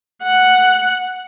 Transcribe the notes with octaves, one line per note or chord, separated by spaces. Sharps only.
F#5